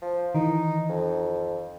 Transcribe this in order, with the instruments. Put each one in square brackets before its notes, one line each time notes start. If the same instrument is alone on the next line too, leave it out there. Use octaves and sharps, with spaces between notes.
[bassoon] F3
[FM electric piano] D#3 E3 [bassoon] D#4
[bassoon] F2